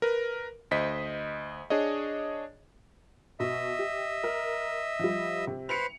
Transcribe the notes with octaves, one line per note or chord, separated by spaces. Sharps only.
A#4 B4
D2 C5 D#5 B6
D4 G#4 C#5 D#5
B2 D#5 E5
G4
A#4
F3 G3
C3
B4 C5 C#7 F7